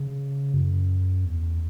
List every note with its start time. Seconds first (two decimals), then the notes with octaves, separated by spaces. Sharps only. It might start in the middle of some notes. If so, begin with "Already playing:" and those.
Already playing: C#3
0.54 F#2
1.25 E2